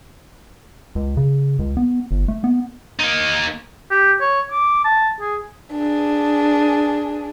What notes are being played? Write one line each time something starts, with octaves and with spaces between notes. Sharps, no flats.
C#2
C#3
C#2
B3
G1
A3
B3
A#3 D#4
G4
C#5
D6
A5
G#4
D4 G#4